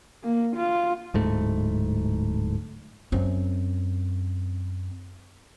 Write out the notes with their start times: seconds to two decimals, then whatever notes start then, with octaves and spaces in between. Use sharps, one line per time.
0.24 A#3
0.56 F4
1.14 D1 G#2 A3
3.12 F#2 C4